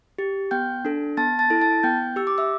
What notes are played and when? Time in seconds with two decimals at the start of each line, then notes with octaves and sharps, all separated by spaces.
0.18 G4
0.51 B3 G5 G6
0.85 D4 A4
1.17 B3 A5 A6
1.39 A5 A6
1.50 E4 A4
1.62 A5 A6
1.83 B3 G5 G6
2.16 G4 E6
2.27 D6
2.38 E5 E6